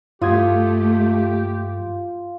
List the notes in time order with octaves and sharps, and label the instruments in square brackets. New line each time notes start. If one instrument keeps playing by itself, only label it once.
[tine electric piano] G2 D#6 G#6 [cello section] A3 [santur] F4 [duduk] G4